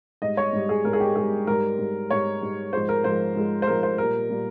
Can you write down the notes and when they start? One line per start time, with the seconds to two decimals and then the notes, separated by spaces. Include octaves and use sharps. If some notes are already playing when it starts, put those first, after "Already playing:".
0.22 G#2 G3 D#5
0.37 C#5
0.53 G#2 G3
0.69 G#4
0.85 G#2 G3 A#4
0.93 G#4
1.00 G4
1.16 G#2 G3 G#4
1.47 G#2 G3 A#4
1.79 G#2 G3
2.10 G#2 G3 C#5
2.42 G#2 G3
2.73 G#2 F3 G#3 C5
2.89 A#4
3.04 G#2 F3 G#3 C5
3.36 G#2 F3 G#3
3.62 C5
3.67 G#2 F3 G#3 A#4
3.83 C5
3.98 A#2 G3 A#4
4.30 A#2 G3